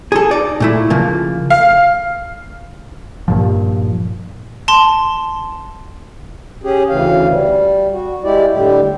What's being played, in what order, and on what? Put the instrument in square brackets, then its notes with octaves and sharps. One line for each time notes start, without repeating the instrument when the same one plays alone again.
[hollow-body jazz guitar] G#4 A4
D#4 D5
A#2 A3 E4
C#3 F3 A#3
[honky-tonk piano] F5
[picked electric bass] G2 A#2 F3
[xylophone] A5 C6
[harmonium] C#4 G4 G#4
D2 C#3 E3 F5
G3
F#4
G#3 E4 G4 D5
A2 D3 G3 G4